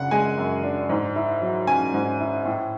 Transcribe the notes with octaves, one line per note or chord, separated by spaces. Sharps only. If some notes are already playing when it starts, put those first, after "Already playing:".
Already playing: F#2 C#3 D4 F#5
G#3 G#5
F#2
D4
G#2
E4
F#3
C#4 G#5
G#2
E4
A2